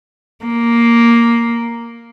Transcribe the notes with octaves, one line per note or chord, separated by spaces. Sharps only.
A#3